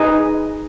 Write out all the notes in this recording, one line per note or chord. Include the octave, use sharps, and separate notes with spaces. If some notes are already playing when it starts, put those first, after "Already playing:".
Already playing: D#4 G#4 B4 D#5